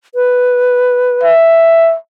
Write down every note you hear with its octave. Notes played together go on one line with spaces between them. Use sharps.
B4
E5